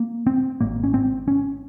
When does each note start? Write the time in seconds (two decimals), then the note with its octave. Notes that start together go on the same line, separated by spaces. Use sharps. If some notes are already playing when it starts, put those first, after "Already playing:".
Already playing: A#3
0.27 C4
0.61 G#1 G#2 A#3
0.84 C#4
0.94 C4
1.28 C#4